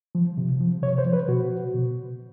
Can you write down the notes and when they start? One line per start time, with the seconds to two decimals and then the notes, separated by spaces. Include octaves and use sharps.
0.15 F3
0.37 C3
0.61 F3
0.83 C3 C#5
0.98 C5
1.06 F3
1.13 B4
1.28 B2 F#4
1.74 B2